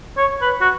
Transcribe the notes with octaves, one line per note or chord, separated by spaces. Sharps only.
C#5
B4
F#4